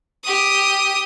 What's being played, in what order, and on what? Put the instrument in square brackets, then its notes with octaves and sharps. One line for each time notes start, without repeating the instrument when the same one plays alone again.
[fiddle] G4 D#6